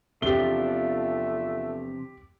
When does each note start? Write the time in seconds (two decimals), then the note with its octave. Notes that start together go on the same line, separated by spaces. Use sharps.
0.22 E2 C3 F3 A3 D4 F4 G4 G7